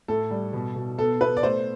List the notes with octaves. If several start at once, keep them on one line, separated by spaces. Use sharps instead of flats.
A2 A4
G3
B2
B2
B3 A4
B3 B4
D5
A3 C5